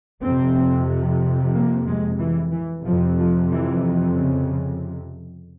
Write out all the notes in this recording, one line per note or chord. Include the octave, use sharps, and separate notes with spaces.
F2 C3 C4
A#3
G#3
E3
E3
F2 C3 F3
F3
E3
C#3